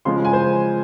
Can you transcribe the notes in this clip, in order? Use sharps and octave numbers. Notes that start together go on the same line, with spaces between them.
C#3 F3 G#3 C6
G#5
C5